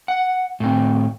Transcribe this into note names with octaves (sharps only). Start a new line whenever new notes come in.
F#5
A2 C4